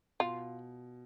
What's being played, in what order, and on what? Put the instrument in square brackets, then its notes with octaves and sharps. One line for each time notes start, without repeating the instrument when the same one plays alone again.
[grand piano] B2 [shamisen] F4